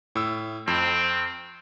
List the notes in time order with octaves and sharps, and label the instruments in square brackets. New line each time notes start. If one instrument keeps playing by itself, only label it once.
[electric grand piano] A2 E6
[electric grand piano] F2 [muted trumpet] C4